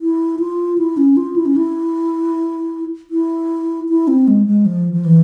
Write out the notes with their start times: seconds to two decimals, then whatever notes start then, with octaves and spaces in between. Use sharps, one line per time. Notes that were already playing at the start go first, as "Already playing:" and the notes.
0.01 E4
0.40 F4
0.78 E4
0.97 C#4
1.17 F4
1.36 E4
1.46 C#4
1.56 E4
3.10 E4
3.89 E4
4.08 C4
4.28 G#3
4.47 G#3
4.66 F3
4.93 F3
5.05 E3